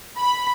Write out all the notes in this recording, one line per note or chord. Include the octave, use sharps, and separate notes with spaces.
B5